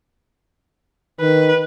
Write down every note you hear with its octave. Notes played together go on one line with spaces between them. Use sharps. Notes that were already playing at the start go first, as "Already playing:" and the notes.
D#3 B4